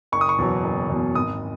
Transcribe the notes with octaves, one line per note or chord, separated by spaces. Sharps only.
F#1 C#6
D#6
C#6
E2 B2 F#3
F#1
E2 B2 F#3
G#1 D#6